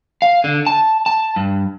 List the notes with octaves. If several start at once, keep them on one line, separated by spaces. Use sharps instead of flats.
F5
D3
A5
A5
G2